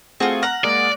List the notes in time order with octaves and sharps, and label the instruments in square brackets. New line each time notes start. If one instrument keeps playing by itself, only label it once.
[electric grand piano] A3 C4 G#4 [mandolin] F4 F#4
[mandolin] F#5 A#5 [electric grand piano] F6 F#6 A#6
[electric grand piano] G#3 A#3 G#4 [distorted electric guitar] D5